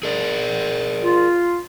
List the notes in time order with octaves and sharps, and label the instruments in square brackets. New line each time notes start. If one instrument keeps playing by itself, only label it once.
[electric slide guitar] G#4 A#4 D5
[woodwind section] F4